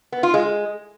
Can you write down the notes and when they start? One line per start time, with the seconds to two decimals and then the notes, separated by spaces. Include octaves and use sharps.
0.12 B3
0.23 F4
0.34 G#3